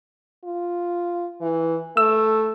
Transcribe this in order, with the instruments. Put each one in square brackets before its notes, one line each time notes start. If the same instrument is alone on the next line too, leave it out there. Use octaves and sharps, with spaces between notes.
[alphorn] F4
E3
[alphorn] A3 [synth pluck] E6